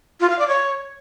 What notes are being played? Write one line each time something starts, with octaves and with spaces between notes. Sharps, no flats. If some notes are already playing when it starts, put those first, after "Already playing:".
F4
F5
D5
C#5